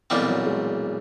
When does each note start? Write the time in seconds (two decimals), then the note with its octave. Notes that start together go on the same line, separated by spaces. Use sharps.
0.10 B1 A#2 E3 G3 C4
0.29 F#3
0.46 G#3